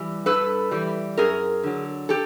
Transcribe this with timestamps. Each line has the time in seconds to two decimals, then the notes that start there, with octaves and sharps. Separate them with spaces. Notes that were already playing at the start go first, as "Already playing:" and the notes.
Already playing: E3 G3
0.26 G2 A4 B4
0.71 E3 G3
1.18 F#2 G#4 A#4
1.63 D3 F#3
2.09 G4 A4